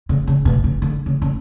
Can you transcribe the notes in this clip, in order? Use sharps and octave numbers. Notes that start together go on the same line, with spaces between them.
C#3
C#3
B2
C#3
D3
C#3
C#3